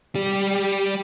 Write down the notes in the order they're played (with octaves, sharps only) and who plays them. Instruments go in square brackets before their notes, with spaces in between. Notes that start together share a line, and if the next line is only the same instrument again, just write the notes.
[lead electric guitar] G3 G4